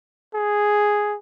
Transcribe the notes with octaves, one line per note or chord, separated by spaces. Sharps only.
G#4